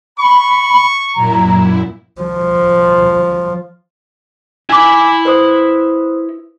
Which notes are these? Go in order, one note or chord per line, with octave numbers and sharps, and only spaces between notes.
B5 C#6
F#2 A#2 E4 A#5
F3
E4 G#5 B5 D6
B4 C5 D#6